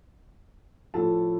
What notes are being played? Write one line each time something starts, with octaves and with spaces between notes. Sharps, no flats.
A2 F3 A4 A5